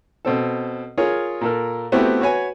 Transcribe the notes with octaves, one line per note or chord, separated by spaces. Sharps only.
B2 C4 A4
F4 G#4 A#4 C#5
A#2 A4 A#4
A3 B3 C4 E4 F#4 G4
F#4 B4 C#5 G#5